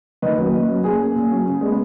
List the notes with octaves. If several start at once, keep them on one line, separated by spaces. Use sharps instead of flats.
D#3 B4 D#5
F#3 A#3 C#4
A#2
F#3 C#4
A#2 G#4
A#3 C#4
A#2
F#3 C#4
C#3
G#3 B3